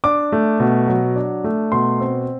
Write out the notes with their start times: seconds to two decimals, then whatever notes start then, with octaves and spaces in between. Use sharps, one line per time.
0.04 D4 D6
0.32 A3
0.60 B2
0.88 F#3
1.16 D4
1.44 A3
1.72 B2 C6
2.00 C4